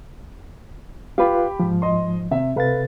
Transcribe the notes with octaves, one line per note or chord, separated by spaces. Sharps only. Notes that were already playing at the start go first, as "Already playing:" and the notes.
F4 G4 B4 F5 B5
G#2 F3
D#5 C6
C3 E5
C3 A4 B4 F5 A6